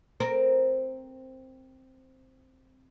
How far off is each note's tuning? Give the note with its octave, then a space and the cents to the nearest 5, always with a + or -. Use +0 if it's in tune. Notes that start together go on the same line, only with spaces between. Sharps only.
C4 +0 A#4 +0